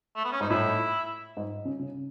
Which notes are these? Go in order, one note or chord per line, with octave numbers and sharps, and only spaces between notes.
A3
B3
C#4
G#2 D#4
A2 E4
G#2
C#3
C#3